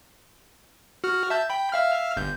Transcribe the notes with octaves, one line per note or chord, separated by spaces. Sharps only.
F#4 F6
E5 A5 G6
G5 B5
E5 F5 F6
G1 G6